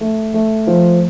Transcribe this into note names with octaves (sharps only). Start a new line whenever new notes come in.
A3
A3
F3